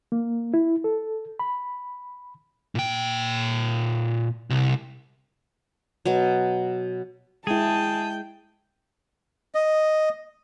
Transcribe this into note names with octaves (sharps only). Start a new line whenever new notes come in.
A#3
E4
A4
B5
A#2 G5
C2
B2 F#3
G#3 E4 G#4 G5 A5
D#5